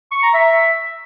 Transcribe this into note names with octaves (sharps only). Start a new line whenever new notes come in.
C#6
A#5
E5